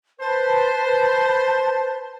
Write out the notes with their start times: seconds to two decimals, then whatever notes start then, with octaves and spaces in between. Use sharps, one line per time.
0.21 B4 C5 A5